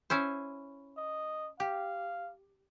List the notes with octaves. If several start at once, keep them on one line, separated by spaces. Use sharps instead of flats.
C#4 E4 C5
D#5
G4 F5